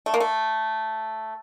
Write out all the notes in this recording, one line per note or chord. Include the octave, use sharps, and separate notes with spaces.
A3
A#3
A3